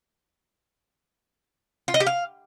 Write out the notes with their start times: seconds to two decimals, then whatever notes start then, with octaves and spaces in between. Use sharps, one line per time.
1.88 F4
1.94 D#5
2.00 G4
2.07 F5